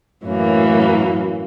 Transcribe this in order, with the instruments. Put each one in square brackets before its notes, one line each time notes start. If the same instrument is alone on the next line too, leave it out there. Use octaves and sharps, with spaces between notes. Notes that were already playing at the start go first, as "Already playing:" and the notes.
[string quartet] F#2 A2 E3 F#3 A#3